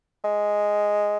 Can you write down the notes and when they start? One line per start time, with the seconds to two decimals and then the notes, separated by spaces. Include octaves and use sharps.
0.24 G#3